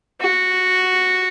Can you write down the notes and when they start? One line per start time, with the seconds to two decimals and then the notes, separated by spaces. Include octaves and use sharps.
0.21 F#4